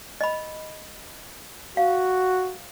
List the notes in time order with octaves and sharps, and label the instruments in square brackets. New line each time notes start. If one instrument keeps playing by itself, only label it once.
[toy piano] D#5 B5
[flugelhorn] F#4 [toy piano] F5